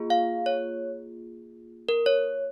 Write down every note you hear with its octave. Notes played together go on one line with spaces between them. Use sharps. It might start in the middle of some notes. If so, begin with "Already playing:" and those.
Already playing: A#3 F4 G#4
F5
C#5
A#4
C#5